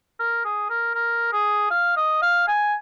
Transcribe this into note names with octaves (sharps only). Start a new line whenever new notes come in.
A#4
G#4
A#4
A#4
G#4
F5
D#5
F5
G#5